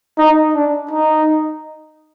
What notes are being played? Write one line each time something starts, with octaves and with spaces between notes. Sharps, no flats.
D#4
D4
D#4